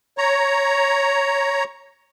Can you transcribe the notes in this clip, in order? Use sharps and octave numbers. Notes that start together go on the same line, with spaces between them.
C#5 A#5